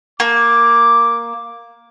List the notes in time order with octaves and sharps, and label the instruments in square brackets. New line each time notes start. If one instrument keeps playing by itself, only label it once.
[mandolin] A#3 [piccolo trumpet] D6